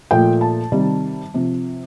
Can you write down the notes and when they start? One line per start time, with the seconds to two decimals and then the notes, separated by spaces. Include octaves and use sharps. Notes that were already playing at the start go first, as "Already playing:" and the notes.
0.11 A#2 F3 A3 G5
0.41 A5
0.72 C3 D#3 G3
1.34 C3 F3